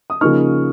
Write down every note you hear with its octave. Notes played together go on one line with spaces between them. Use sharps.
D#6
C#3 F3 A#3 D#4 C#6 F6